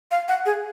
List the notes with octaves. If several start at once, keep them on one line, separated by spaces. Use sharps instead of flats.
F5
F#5
G#4